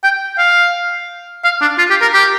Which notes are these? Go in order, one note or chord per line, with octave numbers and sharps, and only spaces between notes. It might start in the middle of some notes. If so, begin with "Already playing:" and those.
G5
F5
F5
D4
F4
G4
A#4
G4